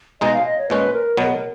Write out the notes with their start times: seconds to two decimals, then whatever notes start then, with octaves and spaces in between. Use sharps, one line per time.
0.21 B2 G#3 D#4 D#5
0.33 F5
0.46 D#5
0.58 C#5
0.70 A#2 G#3 C#4 B4
0.94 A#4
1.17 B2 F#3 B3 A#4
1.25 G#4
1.33 A#4